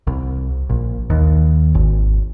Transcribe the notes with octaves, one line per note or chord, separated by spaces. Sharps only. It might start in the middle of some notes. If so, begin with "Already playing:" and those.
C2
A#1
D#2
G#1